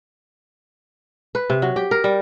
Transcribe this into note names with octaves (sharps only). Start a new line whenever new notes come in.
B4
C3
F#3
G4
A#4
G3